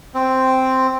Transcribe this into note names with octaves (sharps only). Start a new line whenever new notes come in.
C4